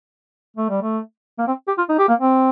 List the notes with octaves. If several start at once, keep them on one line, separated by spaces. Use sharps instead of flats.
A3
G3
A3
A#3
C4
G4
F4
D#4
G4
A#3
C4